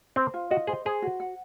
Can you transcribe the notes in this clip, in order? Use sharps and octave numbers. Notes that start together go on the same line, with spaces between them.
C4 C5
F4
F#4 D#5
G#4 C5
G#4 C5
F#4
F#5